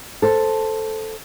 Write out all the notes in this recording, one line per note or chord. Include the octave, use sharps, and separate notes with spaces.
A4 C5